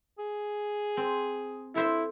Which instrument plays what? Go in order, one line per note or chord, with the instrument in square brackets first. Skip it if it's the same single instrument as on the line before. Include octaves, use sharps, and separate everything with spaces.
[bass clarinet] G#4
[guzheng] C4
[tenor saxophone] E4 [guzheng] A4 C5 E5